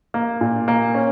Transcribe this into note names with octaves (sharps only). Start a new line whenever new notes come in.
A#3
A#2
A#3
C#4